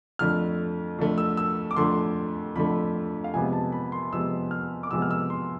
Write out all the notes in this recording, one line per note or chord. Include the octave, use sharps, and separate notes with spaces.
F2 D3 A3 F6
F2 D3 A3
E6
E6
D6
F2 D3 A3 C6
F2 D3 A3 B5
F5
F2 C3 G#3 B3 G#5
A5
B5
C6
F2 C3 G#3 B3 E6
F6
D6
F2 C3 G#3 B3 E6
F6
E6
C6